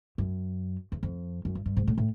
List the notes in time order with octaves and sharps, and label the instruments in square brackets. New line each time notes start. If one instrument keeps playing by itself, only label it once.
[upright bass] F#2
E2
F2
F#2
G2
G2
G#2
A2
A2